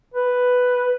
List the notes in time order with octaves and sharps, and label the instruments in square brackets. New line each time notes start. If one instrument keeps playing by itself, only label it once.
[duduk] B4